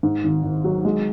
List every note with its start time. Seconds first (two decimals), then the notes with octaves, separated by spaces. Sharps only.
0.03 G#2
0.24 G#1
0.43 G#1
0.64 F#3
0.85 G#3